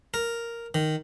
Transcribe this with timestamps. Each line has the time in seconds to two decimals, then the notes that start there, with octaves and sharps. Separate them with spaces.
0.14 A#4
0.74 D#3